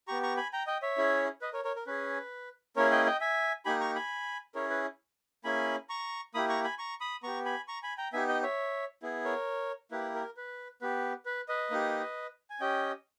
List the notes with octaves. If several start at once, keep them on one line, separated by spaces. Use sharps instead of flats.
B3 G4 A#5 C#6
A#5 C#6
G#5 B5
G5 A#5
D#5 G5
C#5 E5
C#4 E4 G#4
B4 D#5
A#4 C#5
A#4 C#5
A#4
C#4 G#4 B4
A#3 C#4 E4 G#4 A#4 C#5
D#5 G5
D#5 G5
E5 G#5
A#3 D#4 G4 G#5 B5
A#5 C#6
G#5 B5
C#4 E4 G#4 A#4 C#5
B4
A#3 C#4 E4 G#4 G#5 B5
A#5 C#6
A#3 E4 G4 B5 D#6
A#5 C#6
G#5 B5
A#5 C#6
B5 D#6
B3 G4 A#5 C#6
G#5 B5
A#5 C#6
G#5 B5
G5 A#5
B3 D#4 G4 E5 G#5
D#5 G5
C#5 E5
B3 E4 G#4
A#4 C#5
A#3 E4 G4 B4
A#4
B4
B3 G4 B4
B4
B4 D#5
A#3 D#4 G4
G#5
C#4 G4 D#5 G5